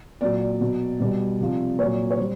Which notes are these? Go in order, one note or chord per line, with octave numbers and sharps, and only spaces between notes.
A#2 F#3 D5
B2 F#3
B2 G3
C3 F3
A#2 C#5
F#3
C#5
G3 C5